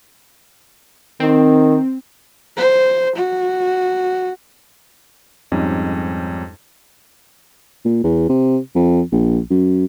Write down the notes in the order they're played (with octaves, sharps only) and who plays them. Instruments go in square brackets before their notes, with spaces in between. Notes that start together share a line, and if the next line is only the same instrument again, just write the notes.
[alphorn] D#3 [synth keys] C4
[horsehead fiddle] C5
F#4
[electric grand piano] F2 G#2 G3 C#4 D#4
[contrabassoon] A#2
E2
C3
F2
A#1
F#2